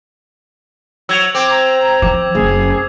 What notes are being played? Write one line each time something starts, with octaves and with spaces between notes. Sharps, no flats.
F#3 E6 G#6 F7
C4 D6
A#5
F3 D6
F#1 G#4